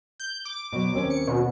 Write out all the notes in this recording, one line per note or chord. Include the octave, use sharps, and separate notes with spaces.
G6
D6
B2 F#3
D#2 C4 C#4
C#7
B2